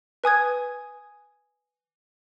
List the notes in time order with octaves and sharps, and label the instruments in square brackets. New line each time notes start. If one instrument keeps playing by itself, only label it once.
[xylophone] B4 G#5 D#6 G#6